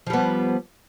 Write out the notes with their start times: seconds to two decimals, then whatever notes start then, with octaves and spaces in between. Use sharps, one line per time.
0.07 F3
0.10 G3
0.13 B3